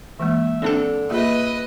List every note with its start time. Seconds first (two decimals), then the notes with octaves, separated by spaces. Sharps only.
0.20 E3 G#3 A#3 E5
0.62 D3 C4 D4 A4
1.10 A#3 F4 G#4 B4 D#5 E5